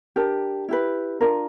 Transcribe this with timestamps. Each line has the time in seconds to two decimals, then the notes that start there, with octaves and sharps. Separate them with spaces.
0.16 D4 G4 A#4 G5 A5
0.69 E4 G4 B4
1.21 D4 F4 A#4